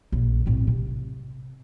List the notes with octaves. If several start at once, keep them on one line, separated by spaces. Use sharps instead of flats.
A#1
A2 C4
C3